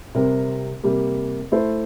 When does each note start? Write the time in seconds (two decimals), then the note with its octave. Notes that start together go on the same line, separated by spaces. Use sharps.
0.14 C3 G3 C4 G4 A#4
0.84 C3 G3 A#3
1.52 A3 E4 A4 C5